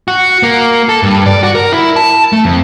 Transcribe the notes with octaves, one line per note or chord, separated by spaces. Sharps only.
F#4
A#3
A4
G2
D5
F#4
A#4
E4
A5
A3
F2